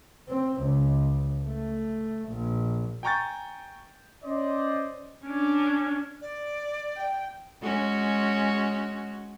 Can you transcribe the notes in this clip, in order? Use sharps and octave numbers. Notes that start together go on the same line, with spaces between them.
C4
C#2
A3
A#1
G5 G#5 A#5 C#6 G6 A6
C#4 C5 D5 D#5
C#4 D4
D5
G5
G#3 C#4 F#4